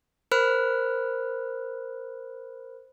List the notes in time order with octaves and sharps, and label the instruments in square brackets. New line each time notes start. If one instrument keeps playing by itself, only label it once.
[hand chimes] A#4 C5 B5 F6 F#6